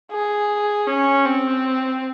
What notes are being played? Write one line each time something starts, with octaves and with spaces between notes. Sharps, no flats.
G#4
C#4
C4